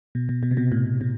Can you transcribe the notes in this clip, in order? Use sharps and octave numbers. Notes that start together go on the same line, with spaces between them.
B2
B2
B2
C3
B2
A2
B2